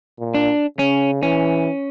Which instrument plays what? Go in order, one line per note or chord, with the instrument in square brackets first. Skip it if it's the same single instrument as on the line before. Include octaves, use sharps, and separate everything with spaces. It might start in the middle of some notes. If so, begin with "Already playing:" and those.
[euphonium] A#2
[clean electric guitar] D4
[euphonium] C#3 [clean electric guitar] C#4
[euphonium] E3 [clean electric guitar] C#4